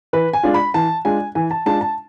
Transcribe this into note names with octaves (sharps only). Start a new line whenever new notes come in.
E3 B4
G#5
G#3 D4 F4
B5
E3 A5
G#3 D4 F4 G#5
E3 G#5
A5
G#3 D4 F4 A5
A5